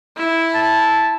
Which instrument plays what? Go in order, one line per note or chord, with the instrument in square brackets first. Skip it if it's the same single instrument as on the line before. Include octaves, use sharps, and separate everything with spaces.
[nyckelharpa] E4
[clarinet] A5